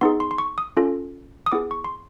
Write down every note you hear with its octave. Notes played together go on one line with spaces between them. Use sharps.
B3 D#4 G#4 C6
C6
C6
C#6
D#6
C#4 F4 A4
D#6
B3 E4 G#4 D6
C#6
C6